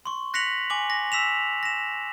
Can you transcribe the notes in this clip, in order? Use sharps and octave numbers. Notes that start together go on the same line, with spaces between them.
C6 C#6
F#6 A#6 B6 C#7 F7 F#7
G#5 D6 F#7
A#6
E6 B6 E7 F7
A#6 E7